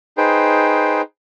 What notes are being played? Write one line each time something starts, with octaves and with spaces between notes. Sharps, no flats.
D#4 G#4 B4 C5 G5